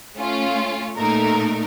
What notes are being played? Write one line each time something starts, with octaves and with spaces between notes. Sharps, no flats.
A3 C#4 F4
A#2 A3 D#4 A#4